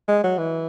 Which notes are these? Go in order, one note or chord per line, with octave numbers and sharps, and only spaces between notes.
G#3
F#3
E3